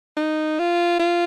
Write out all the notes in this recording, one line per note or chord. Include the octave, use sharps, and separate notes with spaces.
D#4
F4
F4